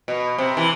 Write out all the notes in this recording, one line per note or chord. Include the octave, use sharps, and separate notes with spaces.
B2
C3
E3